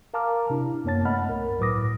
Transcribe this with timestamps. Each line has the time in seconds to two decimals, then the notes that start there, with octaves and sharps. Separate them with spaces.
0.14 A#4 F5 A5 A#5 D6 F6
0.50 C3 D4 E4
0.84 F#2 A#3 B3 C#5 A5 A6
1.05 A3 B3 D#5 F#5 B5 F6
1.29 C2 G2 A#4
1.60 A2 F#3 B4 D6 D#6 A#6